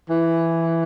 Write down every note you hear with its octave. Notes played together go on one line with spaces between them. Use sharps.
E3